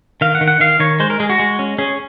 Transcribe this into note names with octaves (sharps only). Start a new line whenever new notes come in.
D#3 F5
F#5
D#3
F#5
D#3 F5
D#3 C#5
G#3 C5
A#4
G#3 G#4
F#4
G#3
C#4
C#4 G#4